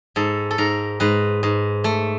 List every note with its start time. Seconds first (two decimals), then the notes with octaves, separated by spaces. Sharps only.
0.16 G#2 A4
0.51 A4
0.58 G#2 A#4
1.00 G#2 B4
1.43 G#2
1.84 A3